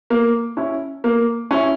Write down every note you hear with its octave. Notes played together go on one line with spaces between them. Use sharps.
A#3
C#4 E4
A#3
C#4 E4